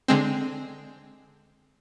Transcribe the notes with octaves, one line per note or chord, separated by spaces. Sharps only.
D3 G#3 C4